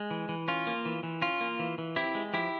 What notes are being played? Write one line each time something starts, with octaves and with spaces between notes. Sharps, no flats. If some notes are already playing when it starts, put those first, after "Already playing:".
Already playing: G#3
E3
E3
C#4 F4
A#3
E3
E3
C#4 F4
A#3
E3
E3
C4 E4 G4
G#3
F3 E4 G4